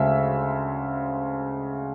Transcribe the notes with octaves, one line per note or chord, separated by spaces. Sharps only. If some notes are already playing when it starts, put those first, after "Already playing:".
Already playing: D2 C#3 G#3 E5